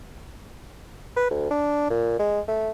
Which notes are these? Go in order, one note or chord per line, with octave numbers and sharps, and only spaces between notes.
B4
D2
D4
A#2
G#3
A3